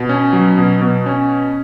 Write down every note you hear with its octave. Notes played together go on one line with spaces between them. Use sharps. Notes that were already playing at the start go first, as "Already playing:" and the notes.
Already playing: B2
C#4
F#3
B2
B2
C#4